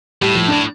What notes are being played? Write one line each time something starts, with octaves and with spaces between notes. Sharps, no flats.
A2 G3
F3
A2 D4